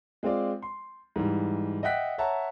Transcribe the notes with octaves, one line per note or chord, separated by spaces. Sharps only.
G#3 C4 F4 D5
C6
G#2 E3 G3
D#5 E5 F#5 G5 F#6 B6
C#5 E5 F#5 A5 A#5